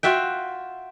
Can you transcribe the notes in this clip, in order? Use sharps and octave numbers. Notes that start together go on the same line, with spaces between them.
F4 F#4 E5 G5